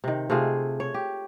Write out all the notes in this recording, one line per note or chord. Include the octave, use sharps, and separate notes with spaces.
C3 D#3
C3 A3 F4 G#4
C#5
G4